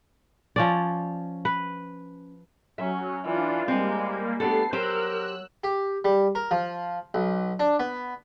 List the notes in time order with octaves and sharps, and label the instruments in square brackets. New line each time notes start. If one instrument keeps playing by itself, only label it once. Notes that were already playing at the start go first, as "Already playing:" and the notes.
[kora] F3 C#4 D5
B4
[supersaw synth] F#3 [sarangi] C#4 [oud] E5
[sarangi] E3 [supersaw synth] D4 F4
[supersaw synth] G3 A#3 [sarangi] G#3 [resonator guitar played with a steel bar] C4
[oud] A3 D4 G4 [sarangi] B3 [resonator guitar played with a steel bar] A4 [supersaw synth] C7
[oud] F#3 [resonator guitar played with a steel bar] G4 C5 [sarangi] A#4 [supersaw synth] E6 F#6
[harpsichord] G4
G3
A#4
F3
B1
D4
B3